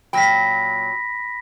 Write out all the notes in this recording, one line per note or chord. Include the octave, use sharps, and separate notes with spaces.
A#2 F#3 G5 B5 A#6 B6